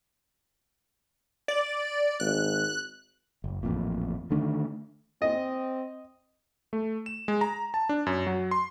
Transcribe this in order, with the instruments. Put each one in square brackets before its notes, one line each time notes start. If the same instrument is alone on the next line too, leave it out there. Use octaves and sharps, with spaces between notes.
[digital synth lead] D5
[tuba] G#1 [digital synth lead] F#6
[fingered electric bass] F#1
A1 F2 A#2
D3 D#3 A3 D4
[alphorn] C4 [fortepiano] D#5
[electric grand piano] A3
E7
G#3
A#5
A5
D4
F#2
F#3
C6